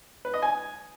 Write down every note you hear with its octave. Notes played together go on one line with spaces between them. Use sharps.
B4
D#5
G#5